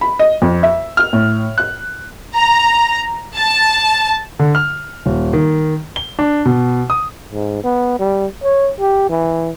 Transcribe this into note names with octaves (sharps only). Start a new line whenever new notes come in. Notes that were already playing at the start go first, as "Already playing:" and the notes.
B5
D#5
F2
E5
F6
A2
F#6
A#5
A5
D3
F6
D#1
D#3
G7
D4
B2
D#6
G#2
B3
G3
C#5
G4
E3